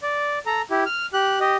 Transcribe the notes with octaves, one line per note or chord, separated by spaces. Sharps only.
D5
A4 A#5
E4 G4
F6
G4 F#6
G4 D#5